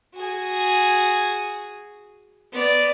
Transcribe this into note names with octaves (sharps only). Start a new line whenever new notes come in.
F#4 G#4
B3 D5